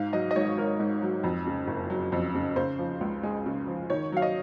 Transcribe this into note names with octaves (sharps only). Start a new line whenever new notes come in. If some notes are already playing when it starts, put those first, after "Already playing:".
Already playing: G#2 F5
F#3 D#5
D#5
G#1 C#5
G#1 A#4
G#2
F#3
F2
C#3
F#1
F#3
F2
C#3
C#3 C5
F3
C#2
G#3
C#3
F3
D#3 C#5
F#3 F5
D#5